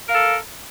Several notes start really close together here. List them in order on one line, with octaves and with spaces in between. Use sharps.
A#4 F5 A4